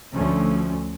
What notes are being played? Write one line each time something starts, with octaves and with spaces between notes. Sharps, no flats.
D2 F3 A3 C#4